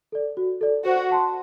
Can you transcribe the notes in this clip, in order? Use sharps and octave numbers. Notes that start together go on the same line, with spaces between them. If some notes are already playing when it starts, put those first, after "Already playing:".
A4 D5
F#4
A4 D5
F#4 C5
F#5 A5 C6